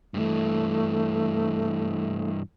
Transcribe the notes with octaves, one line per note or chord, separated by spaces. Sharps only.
G2 E3 A3